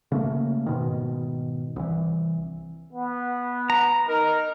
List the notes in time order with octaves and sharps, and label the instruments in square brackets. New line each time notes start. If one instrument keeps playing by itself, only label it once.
[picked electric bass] C#3 A3 A#3
G#2 B2 D#3
C2 E3
[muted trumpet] B3
[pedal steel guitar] A#5
[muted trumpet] D#4 [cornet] A#4